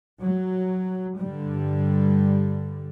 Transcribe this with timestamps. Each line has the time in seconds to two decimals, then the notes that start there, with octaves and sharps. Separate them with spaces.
0.21 F#3
1.19 G2 D3 G3